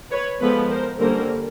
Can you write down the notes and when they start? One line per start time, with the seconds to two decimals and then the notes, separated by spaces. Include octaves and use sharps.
0.11 B4 C#5
0.40 F3 G#3 B3 A4 B4
0.70 A#4 C5
0.99 D3 G3 A#3 C#4 A#4 C5